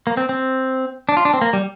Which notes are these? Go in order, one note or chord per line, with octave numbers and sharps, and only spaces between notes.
A#3
C4
C4
D4
F4
D4
C4
A#3
G3